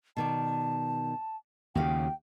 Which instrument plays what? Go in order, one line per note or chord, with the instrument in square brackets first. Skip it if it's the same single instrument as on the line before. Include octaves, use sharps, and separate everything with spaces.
[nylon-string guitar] B2 D#3 D5 [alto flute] A5
[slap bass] D#2 C#3 [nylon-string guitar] F#4 G4 F5 [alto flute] G5